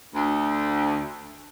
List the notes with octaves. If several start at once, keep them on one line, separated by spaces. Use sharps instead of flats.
D2